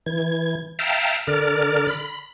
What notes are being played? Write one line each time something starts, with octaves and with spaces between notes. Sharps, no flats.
E3 G#6
E5 F5 G5 A5 A#5
D3 A#4 D5 F6
B5